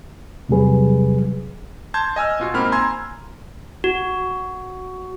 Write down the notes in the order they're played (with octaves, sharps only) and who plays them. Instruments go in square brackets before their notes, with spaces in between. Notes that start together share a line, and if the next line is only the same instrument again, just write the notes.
[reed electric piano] E2 C3 F#3 G3 G#4 B4
[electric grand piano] A5 C6 G6 G#6
D#5 G#5 E6 F6
B2 F4 F#4
G#2 A#3 C4 B5 F6
G#5 A#5 C6 E6 G#6
[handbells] F#4